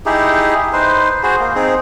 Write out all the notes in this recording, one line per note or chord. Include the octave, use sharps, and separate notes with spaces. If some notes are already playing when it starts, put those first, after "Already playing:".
D#4 E4 G4 G#4
D#4 B4 C5
F#4 G#4 C5
A#3
C4 D#4 G#4